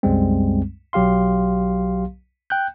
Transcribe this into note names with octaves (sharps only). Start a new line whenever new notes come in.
C2 F#2 G3 G#3 C4
B1 F#3 G4 F5 C6
G5 F#6 G6